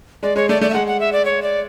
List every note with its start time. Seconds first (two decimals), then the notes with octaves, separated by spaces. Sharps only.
0.23 G#3 D5
0.36 G#3 C#5
0.49 A3 D5
0.61 A3 D5
0.70 E5
0.74 G#3 F#5
0.87 F#5
1.00 E5
1.12 D5
1.25 C#5
1.42 D5